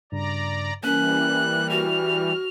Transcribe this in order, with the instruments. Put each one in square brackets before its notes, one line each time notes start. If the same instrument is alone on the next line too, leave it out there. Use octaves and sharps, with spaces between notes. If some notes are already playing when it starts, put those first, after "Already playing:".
[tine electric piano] G2 C#3 [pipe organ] D5 A#5
[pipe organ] E3 G3 [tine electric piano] A#3 A#4 [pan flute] C#4 [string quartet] F#6
[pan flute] F#4 [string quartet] F6